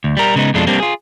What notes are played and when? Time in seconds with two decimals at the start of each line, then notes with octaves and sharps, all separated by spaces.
0.04 D2
0.17 G3 A#4
0.36 C#3 G#3 B3 D#4
0.54 F2 B2 G#3 D4 F4 A4
0.67 G3 A#3 C4 D4
0.80 F4 G#4